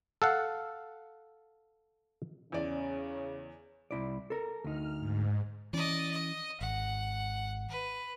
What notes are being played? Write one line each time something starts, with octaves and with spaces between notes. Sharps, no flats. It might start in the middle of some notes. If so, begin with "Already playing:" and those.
A4 F5 F#5
E2 C#3 C#4 D5
C2 E4 D5
A4 A#4
D2 D#4 F6
G#2
E3 C#4 D5 D#5
D#5
G#1 F#5
B4